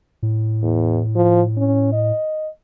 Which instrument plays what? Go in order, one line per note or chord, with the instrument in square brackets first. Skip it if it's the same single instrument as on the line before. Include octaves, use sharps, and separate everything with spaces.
[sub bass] A2
[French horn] E2
F3
C#4
D#5